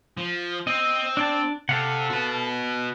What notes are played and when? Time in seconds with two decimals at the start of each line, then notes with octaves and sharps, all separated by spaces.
0.17 F3
0.67 C4 D#5
1.17 D4 D5 A5
1.69 C3 A4 F5 F#5
2.10 F#4 B4